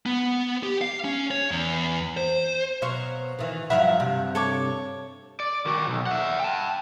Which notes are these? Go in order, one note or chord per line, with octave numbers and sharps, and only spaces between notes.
B3
G4
F5
C#4
C#5
E2
C5
B2 F#3 C5 F5 C#6
D#3 E3
G2 F3 F#3 E5 F#5 B5
G2 C3
A4 C#5 D6
D5
D#3 F#4
B1
E5 F#5
G5 A5